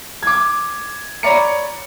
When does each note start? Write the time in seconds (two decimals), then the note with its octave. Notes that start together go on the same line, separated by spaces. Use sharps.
0.23 D6 G#6
1.23 C#5 D5 A#5 B5 C#7